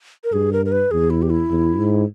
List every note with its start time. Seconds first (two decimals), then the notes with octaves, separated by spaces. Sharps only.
0.24 A#4
0.32 G2 G#4
0.52 A#4
0.65 A#4
0.72 B4
0.91 E2 G#4
1.10 E4
1.22 G4
1.31 E4
1.50 E2
1.78 G#2